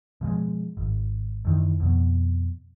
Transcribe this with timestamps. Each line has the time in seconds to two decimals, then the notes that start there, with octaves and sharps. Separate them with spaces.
0.21 B2 F3 G3 G#3
0.77 G#1
1.45 F#2 D#3 E3
1.80 F2 B2